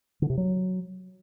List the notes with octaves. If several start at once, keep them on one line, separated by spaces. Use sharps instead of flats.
D3
C3
F#3